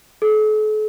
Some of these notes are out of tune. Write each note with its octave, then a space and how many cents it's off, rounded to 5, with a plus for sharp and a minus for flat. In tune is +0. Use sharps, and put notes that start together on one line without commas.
A4 -45